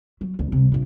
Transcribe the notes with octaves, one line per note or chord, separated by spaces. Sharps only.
F#3
D2
C3 G3
A#1 A#2